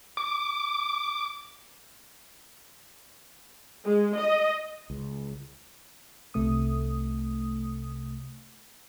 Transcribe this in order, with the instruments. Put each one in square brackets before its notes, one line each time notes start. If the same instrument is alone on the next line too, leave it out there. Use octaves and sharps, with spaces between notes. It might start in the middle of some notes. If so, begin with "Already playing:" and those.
[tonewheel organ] D6
[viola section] G#3
D#5
[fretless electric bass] C#2
[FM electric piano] C2 C3 A3 D#6